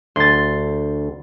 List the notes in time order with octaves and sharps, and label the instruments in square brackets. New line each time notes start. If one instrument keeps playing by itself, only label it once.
[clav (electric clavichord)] D2 [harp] C6 A6